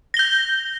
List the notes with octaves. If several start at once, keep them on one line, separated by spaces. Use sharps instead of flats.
G6 A#6 G7